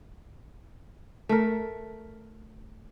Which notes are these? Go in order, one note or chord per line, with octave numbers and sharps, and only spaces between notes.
A3 A#4